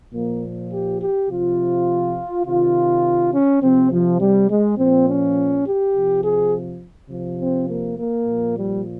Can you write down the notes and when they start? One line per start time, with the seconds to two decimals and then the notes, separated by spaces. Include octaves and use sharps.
0.13 A#2 F3 A#3
0.73 G4
1.01 G4
1.30 C3 F3 F4
2.46 C3 D#3 F4
3.33 C#4
3.62 C3 F3 C4
3.92 F3
4.20 G3
4.49 G#3
4.78 A#2 F3 C4
5.08 C#4
5.65 G4
5.95 C3 F3
6.23 G#4
7.10 C3 F3
7.40 C4
7.68 A#3
7.97 A#3
8.26 A#2 F3
8.56 G3